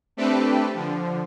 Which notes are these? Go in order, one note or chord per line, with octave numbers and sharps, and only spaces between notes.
A3 C4 D4 G4 A4 B4
D3 F3